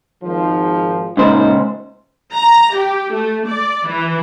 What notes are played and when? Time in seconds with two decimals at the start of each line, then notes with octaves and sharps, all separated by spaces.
0.24 G#1 G#2 F3
1.17 C#2 A#2 D#4 C5
2.34 A#5
2.76 G4
3.12 A3
3.48 D5
3.87 E3